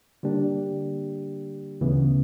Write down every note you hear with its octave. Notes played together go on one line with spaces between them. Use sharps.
D3 G3 A#3 D4 G4
D2 C#3 E3 B3